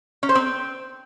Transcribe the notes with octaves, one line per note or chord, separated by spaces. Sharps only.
C#4
C5
C4